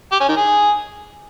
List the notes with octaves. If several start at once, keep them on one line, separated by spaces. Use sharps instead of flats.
G4
C#4
D#3
G#4